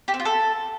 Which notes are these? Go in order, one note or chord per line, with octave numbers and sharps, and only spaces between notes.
G4
C4
F4
A4